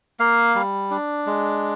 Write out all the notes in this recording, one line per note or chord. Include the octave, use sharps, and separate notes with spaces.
A#3 F5
G3
D4
G#3